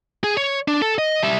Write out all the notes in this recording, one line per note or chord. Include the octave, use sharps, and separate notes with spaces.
G#4
C#5
D4
A4
D#5
G3 E5